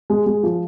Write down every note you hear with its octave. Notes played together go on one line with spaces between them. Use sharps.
G#3
G#3
F3